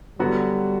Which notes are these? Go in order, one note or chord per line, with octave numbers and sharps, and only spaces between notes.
D3 F#3 G3 B3 F#4